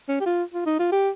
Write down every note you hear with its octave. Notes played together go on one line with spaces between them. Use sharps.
C#4
G4
F4
F4
D#4
F4
G4